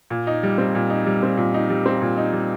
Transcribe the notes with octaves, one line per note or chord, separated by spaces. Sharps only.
A#2
D#4
G3
C4
A#2
D#4
G3
C4
A#2
D#4
G3
C4
A#2
D#4
G3